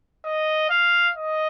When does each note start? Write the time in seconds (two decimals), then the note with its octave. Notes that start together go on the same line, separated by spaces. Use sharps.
0.25 D#5
0.70 F5
1.17 D#5